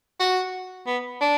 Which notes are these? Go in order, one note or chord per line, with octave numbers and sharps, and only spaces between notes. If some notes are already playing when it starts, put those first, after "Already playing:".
F#4
B3
D4